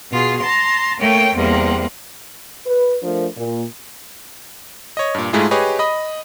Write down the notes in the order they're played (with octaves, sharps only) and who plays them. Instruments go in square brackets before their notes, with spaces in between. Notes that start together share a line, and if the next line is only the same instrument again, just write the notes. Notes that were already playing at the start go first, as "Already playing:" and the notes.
[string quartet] B2 F4 G#4
A5 A#5 C6
A3 A#3 C#5 G5
E2 C3 G3 A#3
[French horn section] B4
F3 A3 D4 A#4
A#2
[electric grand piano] C#5 D#5
G2 A#2
G#2 G#3 A3 E4 F4 G#4
G4 G#4 B4 C#5 D#5
D#5 B5 D#6